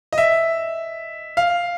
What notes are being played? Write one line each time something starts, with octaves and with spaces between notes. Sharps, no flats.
D#5
E5
F5